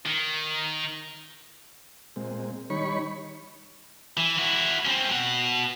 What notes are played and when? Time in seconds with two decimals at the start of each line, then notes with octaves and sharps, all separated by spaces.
0.06 D#3
2.16 A#2 G#3 C4
2.70 D#3 G3 D#4 C#5 B5 C#6
4.17 E3
4.38 E4 F#4
4.85 C4 C#4
5.11 B2 F#5